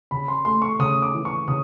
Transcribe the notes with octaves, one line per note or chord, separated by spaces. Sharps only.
C#3 B5
C6
A3 C6
C#6
C#3 D#6
D6
E3
C#6
C#3 D#6